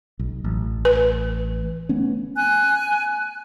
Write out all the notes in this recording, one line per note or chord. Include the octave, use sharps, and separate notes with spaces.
B1
A1
B4
A3 B3 C#4
G#5 F#6